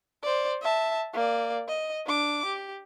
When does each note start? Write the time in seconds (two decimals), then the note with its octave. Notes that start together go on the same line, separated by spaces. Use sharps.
0.23 C5 D5
0.62 E5 A5
1.14 A#3 D5
1.68 D#5
2.06 D4 D6
2.46 G4